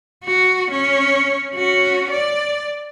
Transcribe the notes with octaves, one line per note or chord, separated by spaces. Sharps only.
F#4
C#4
C#4 F#4
D5